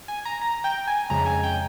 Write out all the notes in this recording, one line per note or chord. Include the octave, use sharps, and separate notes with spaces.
G#5
A#5
A#5
G5
G#5
F2 C#3 G#3 A#5
G#5
G5